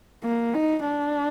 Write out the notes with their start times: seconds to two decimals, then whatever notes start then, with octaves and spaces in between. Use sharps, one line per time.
0.23 A#3
0.54 D#4
0.86 D4